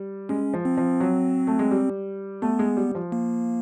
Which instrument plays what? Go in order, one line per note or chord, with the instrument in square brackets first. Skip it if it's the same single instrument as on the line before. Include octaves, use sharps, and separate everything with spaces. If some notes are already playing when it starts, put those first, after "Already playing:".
Already playing: [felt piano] G3
[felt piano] G#3 [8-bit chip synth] C#4
[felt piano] F3
[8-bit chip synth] C4
[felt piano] F3
F#3
A3
G#3
G3
[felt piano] A3 [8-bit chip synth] B3
[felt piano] G#3
G3
F3
[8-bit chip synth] A#3